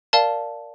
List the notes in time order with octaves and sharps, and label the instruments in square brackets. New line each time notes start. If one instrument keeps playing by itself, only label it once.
[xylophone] A#4 D5 F5 A5